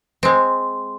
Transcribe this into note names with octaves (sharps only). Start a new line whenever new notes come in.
G#3 C4